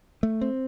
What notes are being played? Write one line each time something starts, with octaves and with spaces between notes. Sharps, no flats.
A3
C4